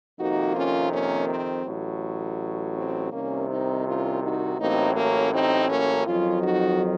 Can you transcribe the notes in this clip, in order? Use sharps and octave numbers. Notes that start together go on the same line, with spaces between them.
F2 C3 D#3 A#3 D#4 F#4
C#4 F4
A#3 C#4
C4
A1 A2 F#3
C4
C2 C3 D#3 A#3 C#4
C4 D#4
C#4 F4
D#4 F#4
A1 A2 F#3 A#3 C4 D#4
A#3 C#4
C4 D#4
A#3 C#4
F2 D#3 F#3 C#4 F4
D#4 F#4